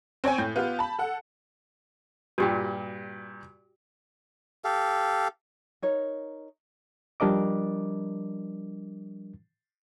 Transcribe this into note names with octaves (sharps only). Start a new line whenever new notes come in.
C4 C#5 G5 G#5
A2 G6
B3 F4 G4 F5
A5 B5
A4 F#5
G2 A#2 F#4 G4 G5
G4 A4 F5
D#4 A#4 C#5
F3 G3 D4 A#4 D#5 D6